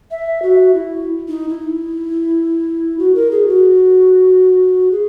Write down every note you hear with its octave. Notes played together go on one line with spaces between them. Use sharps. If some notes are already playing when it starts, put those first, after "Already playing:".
E5
F#4
E4
D#4
E4
F#4
A#4
G#4
F#4
G#4